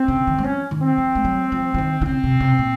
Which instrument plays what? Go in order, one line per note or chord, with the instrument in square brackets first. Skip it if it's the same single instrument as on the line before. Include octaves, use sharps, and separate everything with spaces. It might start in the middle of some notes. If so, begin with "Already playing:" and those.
Already playing: [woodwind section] C4
[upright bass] C#3
D#3
F#3
[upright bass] F3 [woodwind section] C#4
[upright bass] D#3
[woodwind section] C4
[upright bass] F3
A3
F#3
F3
F3
D#3
D#3
[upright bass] C#3 [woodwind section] C4
[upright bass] C3
C3
A#2